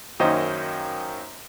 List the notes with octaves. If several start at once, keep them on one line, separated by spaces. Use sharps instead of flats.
F#2 D#3 A#3 C#4 C5 D#5